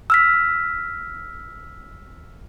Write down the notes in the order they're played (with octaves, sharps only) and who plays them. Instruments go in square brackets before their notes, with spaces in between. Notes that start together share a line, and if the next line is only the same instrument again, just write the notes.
[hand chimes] E6 F6 B6